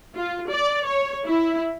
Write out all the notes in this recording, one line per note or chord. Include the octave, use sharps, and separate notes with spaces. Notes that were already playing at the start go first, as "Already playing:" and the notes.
F4
D5
C#5
E4